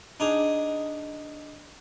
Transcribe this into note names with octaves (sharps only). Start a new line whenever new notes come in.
D4 D#4 G#4